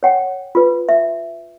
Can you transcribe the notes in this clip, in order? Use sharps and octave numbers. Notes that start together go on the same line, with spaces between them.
C#5 F#5 G5
F4 B4
E5